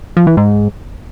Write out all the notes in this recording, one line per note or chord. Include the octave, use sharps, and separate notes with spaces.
F3
E3
G#2